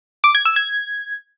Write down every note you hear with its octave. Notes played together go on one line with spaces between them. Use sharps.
D6
G#6
E6
G#6